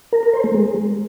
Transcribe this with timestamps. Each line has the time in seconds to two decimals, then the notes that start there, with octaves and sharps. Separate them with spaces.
0.12 A#4
0.23 A#4
0.33 C5
0.44 A3
0.54 G#3